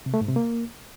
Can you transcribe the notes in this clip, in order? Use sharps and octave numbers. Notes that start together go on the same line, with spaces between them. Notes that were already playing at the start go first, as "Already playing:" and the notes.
C3
A3
G#2
C3
A#3